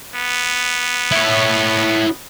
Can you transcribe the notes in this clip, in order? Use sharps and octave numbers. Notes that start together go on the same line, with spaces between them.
B3
E4 C#5